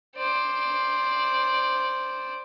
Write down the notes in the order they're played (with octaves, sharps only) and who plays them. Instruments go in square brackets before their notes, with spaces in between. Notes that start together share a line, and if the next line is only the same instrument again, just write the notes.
[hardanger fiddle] C5 D5